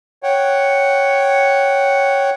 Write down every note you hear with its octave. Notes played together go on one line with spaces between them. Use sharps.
C#5 F#5 G5